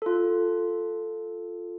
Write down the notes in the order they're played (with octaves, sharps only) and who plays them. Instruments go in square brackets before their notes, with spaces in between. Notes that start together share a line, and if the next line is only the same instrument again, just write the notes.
[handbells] F4 A4